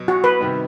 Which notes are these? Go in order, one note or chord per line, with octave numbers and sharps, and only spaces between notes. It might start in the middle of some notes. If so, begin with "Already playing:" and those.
Already playing: B2 F#3
F#4
B4
C3 D#3 G3 B3